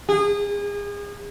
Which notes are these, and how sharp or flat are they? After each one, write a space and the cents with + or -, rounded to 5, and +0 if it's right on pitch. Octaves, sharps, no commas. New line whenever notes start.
G#4 -35